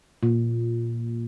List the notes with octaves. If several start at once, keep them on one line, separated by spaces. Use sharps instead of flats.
A#2